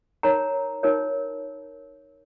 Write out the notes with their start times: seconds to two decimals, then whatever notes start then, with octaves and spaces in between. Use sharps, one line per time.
0.23 D#4 A#4 C#5 A#5
0.83 D#4 A#4 C#5